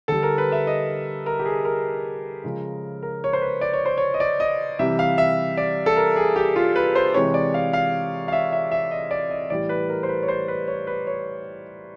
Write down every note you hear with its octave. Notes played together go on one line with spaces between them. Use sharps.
D3 G3 A4
A#4
B4
E5
D#5
A#4
G4
G#4
A#4
C#3 F3 G#3
A#4
C#5
C5
B4
D5
C#5
C5
C#5
D#5
D5
D#5
C3 E3 G3 E5
F5
E5
D5
A4
A#4
G#4
G4
F4
B4
C5
C3 E3 G#3 C#5
D5
F5
F5
F5
E5
E5
E5
D#5
D5
D#5
A2 E3 G3 D5
B4
A#4
C5
B4
C#5
C5
B4
C#5
B4
C#5